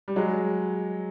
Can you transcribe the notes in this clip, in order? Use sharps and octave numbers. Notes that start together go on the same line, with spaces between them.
G3
F#3 G#3